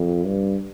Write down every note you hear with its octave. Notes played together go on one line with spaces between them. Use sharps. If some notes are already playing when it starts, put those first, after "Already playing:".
Already playing: F2
G2